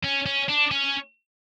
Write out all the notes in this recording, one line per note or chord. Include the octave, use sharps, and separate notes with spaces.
C#4
C#4
D4
C#4